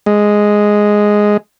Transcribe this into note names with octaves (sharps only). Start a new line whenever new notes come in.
G#3